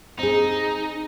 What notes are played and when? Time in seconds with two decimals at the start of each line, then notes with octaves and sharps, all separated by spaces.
0.19 C4 D#4 G#4